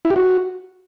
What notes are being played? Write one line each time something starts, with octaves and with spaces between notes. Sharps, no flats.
E4
G4
F#4